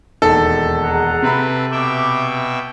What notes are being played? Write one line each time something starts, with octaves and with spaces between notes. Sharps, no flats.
E1 D#2 D#3 A4
G#4 F#5 A#5
C3 C4 B4 B5
B2 E5 G5 D6